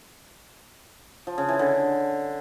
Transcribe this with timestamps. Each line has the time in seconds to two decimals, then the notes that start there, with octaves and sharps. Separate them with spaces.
1.27 F3
1.38 C#3
1.49 E3
1.59 D3